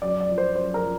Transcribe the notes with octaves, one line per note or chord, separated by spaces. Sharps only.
F#2 D5
D5
F3
C5
F#2 C5
A#4
F3